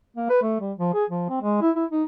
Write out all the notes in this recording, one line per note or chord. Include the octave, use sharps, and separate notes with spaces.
A#3
B4
A3
G3
F3
G#4
F3
C4
G#3
E4
E4
D#4